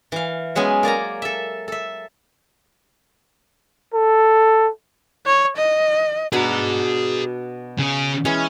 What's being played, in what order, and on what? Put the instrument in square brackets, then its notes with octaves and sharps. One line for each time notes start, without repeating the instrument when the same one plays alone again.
[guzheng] E3 F5
F#3 G#3 B3 C#4
A#3 D5 G#5 A#5
A4 E5
A4 E5
[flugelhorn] A4
[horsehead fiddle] C#5
D#5
[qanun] B2 D4 B5 [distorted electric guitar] G#4 A#5
[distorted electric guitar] C#3 G#4
[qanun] E3 G#3 [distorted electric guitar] C#4